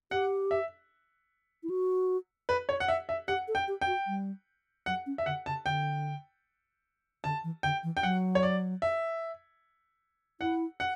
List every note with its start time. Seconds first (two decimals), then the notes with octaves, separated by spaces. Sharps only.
0.11 G4 F#5
0.51 E5
1.63 E4
1.70 F#4
2.49 B4
2.69 C#5
2.80 F#5
2.88 E5
3.09 E5
3.28 G4 F#5
3.48 A4
3.55 G5
3.68 G4
3.81 G5
3.87 F#4
4.07 G3
4.86 F#3 F#5
5.06 C#4
5.18 E5
5.26 D3 F#5
5.46 C#3 A5
5.66 D3 G5
7.24 D3 A5
7.44 E3
7.63 D3 G5
7.83 E3
7.97 G5
8.03 F#3 F#5
8.35 C#5
8.43 D5
8.82 E5
10.41 E4 F#5
10.80 F#5